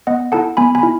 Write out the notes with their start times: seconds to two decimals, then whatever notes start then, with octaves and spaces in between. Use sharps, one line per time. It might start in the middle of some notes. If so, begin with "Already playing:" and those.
0.07 B3 D#5 F#5
0.32 E4 A4 F#5 A5
0.57 B3 G#5 B5
0.75 G#5 B5
0.83 E4